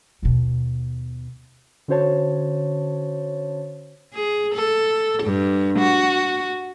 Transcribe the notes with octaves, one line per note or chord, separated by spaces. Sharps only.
D#2 B2
D3 C#4 F#4 C5 C#5 A5
G#4
A4
G2
F#4